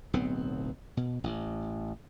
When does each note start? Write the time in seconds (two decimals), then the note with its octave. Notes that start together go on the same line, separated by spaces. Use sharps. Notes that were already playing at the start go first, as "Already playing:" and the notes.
0.13 D1 B1 B3 C4
0.97 B2
1.24 A1